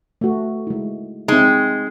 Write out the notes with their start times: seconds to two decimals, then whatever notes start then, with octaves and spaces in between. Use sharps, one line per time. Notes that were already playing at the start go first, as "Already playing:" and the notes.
0.21 A3 F#4
0.67 G#3 E4
1.28 G#3 C4 D#4